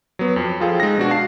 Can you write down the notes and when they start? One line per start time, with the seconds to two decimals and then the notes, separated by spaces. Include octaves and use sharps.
0.19 F#3 B3
0.36 F2
0.60 F3 F4 G#4 A4 F5 G5
0.80 G#3 D#4 A#6
0.98 B2 D4 F#4
1.11 F5 A5 C7